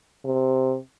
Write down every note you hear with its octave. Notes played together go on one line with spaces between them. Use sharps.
C3